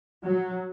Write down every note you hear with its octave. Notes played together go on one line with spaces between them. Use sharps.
F#3